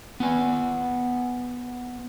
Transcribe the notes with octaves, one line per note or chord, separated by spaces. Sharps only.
B3 G#5